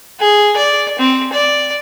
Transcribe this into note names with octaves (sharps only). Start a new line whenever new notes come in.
G#4
D5
C4
D5